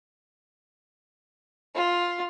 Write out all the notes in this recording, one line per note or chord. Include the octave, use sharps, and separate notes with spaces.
F4